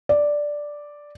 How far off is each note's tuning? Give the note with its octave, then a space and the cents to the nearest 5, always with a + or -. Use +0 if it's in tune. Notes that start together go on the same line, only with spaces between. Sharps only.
D5 +0